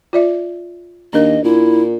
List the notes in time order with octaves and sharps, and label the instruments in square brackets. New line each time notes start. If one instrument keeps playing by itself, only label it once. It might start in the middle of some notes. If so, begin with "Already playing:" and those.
[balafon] F4 D5 E5
[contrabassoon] D#2 [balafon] D4 A#4 [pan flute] D#5
[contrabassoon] A#2 [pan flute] E4